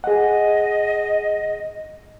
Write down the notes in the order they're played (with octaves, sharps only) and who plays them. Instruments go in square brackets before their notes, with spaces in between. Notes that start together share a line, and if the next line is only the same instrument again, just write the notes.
[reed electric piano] G#4 F#5 [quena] D#5